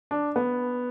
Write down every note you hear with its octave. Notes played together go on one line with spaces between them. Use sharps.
D4
B3